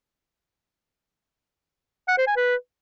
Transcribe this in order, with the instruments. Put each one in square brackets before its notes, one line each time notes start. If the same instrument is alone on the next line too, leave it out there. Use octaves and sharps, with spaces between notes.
[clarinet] F#5
C5
G#5
B4